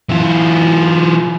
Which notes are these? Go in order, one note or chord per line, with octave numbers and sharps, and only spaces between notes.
E3 F4